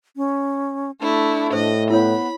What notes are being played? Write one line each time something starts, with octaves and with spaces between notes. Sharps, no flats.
C#4
A3 D4 E4
A2 C5 D#5
B3 E4 C#5 B5